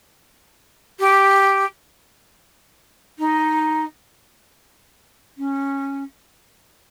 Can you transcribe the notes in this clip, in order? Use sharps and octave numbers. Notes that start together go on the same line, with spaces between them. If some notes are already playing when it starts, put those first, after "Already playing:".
G4
D#4
C#4